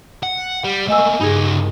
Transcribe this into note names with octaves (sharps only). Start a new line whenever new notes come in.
F#5
G3
A3 A#3 D#5 G#5 E6
C#2 G2 D#4 G#4